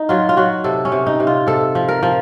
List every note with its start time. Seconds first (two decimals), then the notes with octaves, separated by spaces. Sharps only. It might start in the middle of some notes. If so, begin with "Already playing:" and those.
Already playing: D#4
0.09 F#3 F4
0.29 F4
0.37 F#3 F#4
0.64 C3 A4
0.85 C#4
0.92 C3
1.07 D#4
1.20 C3
1.27 F4
1.47 C3 A4
1.75 F3
1.88 A#4
2.03 F3